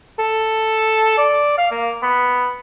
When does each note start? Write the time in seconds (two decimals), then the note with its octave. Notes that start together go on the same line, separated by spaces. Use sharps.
0.19 A4
1.18 D5
1.58 F5
1.71 A#3
2.03 B3